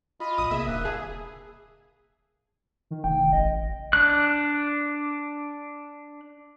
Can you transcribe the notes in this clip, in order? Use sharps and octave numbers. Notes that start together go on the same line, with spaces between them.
F4 D#5 B5
A#1 D#6
C3 A#3 G#4 E5
D#1 D#2 D3 A#3 D#6 F#6
G#4 A5
D#3
F1 G5
A1 D#5
D4 F#6